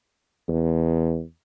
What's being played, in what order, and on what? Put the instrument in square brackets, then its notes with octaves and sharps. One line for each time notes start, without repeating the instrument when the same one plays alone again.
[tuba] E2